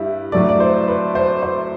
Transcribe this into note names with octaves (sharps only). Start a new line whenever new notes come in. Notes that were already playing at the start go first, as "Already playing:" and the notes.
Already playing: G2 G3 E4
A2 F#3 A3 D5
D5
C5
B4
C5
C5